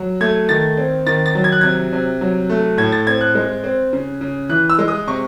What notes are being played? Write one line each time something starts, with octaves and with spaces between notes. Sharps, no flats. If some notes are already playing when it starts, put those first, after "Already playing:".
Already playing: F#3
A3 G#6
D#3 A6
C4
D#3 A6
A6
F#3
G#6
F#6
C3 G#6
C3
F#3
A3
A2 G#6
A6
C4 G#6
F#6
G#3
C4
C#3
C#3
E3 F#6
E6
G#3
D#6
C3 C#6